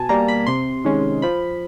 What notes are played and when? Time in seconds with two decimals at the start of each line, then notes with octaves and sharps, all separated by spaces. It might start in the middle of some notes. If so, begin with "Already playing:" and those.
Already playing: B2 G#5 A5
0.09 G3 A#3 A#5
0.28 B5
0.46 C3 C6
0.84 D#3 G#3 C#4
1.22 F3 B5